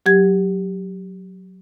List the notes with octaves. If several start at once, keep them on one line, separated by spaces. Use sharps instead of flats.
F#3 G4 G#6